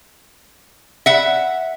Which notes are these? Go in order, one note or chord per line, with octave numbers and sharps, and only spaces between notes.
E5 F#5